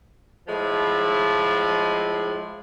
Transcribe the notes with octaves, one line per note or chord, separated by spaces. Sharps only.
A2 F3 G#3